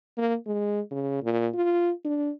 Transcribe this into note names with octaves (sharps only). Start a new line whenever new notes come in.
A#3
G#3
C#3
A#2
F4
D4